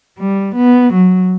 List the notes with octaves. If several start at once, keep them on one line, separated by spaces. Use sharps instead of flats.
G3
B3
F#3